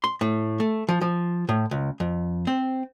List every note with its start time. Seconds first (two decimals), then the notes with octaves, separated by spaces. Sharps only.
0.04 C6
0.21 A2
0.60 A3
0.89 F3
1.01 F3
1.49 A2
1.71 C#2
2.00 F2
2.47 C4